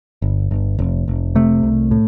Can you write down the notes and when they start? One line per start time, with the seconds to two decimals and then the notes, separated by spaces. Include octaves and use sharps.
0.22 G1
0.51 G1
0.79 F1
1.08 F1
1.35 C3 A3
1.63 C2
1.91 A2